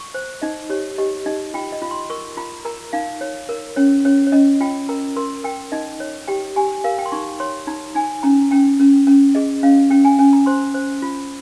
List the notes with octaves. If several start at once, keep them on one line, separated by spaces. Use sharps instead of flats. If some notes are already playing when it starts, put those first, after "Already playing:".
Already playing: C#6
C5
D#4 D#5
G4 C#5
G4 D#5
D#4 D#5
F4 G5
D#5
F4
C6
A#4 C#6
F4 A#5
A#4 A#5
D#4 F5
C#5
A#4
C#4 C#5
C#4 C#5
C#5
C#4 D#5
F4 G5
A#4 A#5
A#4 C6
A#4 G5
D#4 D#5
C#5
G4 G5
G4 G#5
A#4 F5
G5
C6
D#4 C#6
C#5 C6
D#4 A#5
D#4 G#5
C#4 A#5
C#4 G5
C#4
C#4
G#4 D#5
C#4 F5
C#4 G5
G#5
C#4 G#5
A#5
C5 C6
C5
F4